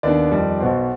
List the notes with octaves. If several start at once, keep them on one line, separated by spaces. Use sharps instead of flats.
D#2 D#3 B3 D4 D5
F2 D#3 G3
B1 B2 B3 C5